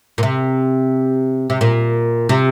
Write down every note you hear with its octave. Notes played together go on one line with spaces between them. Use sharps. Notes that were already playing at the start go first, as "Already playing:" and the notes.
A#2
C3
C3
A#2
C3